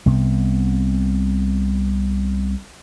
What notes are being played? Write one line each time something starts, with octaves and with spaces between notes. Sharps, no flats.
C2 C3 B3